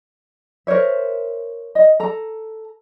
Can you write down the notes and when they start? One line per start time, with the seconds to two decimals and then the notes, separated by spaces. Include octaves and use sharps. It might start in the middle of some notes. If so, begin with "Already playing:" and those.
0.67 A#4 C5 C#5 E5
1.75 D#5
2.00 A4 A#5